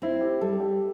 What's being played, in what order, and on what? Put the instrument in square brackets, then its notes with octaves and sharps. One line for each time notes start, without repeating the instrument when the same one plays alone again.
[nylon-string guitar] C4 [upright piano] E4
[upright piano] G4
[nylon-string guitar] G3 [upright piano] A4
[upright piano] G4